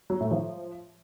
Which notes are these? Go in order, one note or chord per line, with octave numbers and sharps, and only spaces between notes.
F#3
A2
F3